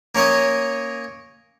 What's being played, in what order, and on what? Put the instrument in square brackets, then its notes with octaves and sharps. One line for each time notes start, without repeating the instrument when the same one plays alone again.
[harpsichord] A#3 C#4 A#4 C#5 D#5